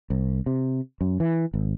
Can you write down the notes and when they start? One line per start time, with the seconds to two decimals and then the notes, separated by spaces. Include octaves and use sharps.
0.10 C2
0.46 C3
1.01 F#2
1.20 E3
1.54 G#1